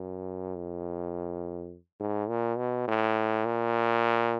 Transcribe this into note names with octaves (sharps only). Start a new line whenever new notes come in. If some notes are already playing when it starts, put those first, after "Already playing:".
Already playing: F#2
F2
G#2
A#2
B2
A2
A#2